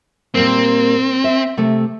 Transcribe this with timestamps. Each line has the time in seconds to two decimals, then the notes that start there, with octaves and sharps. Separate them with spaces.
0.35 A#2 G3 A#3 C4
1.24 E5
1.57 C3 A3